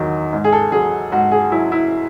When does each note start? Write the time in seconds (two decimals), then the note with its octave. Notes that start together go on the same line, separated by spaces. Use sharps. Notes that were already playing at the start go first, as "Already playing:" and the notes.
Already playing: E2 D#3 F#3
0.33 G#2
0.44 G#4
0.52 A4
0.72 F#3 G#4
1.12 G#2 F#4
1.32 G#4
1.51 F#3 E4
1.72 E4